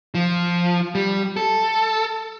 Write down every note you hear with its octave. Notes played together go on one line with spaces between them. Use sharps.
F3
G3
A4